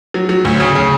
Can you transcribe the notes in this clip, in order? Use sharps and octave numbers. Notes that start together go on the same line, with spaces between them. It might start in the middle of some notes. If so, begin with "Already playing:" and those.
F#3
F#3
D2
C#3
C#3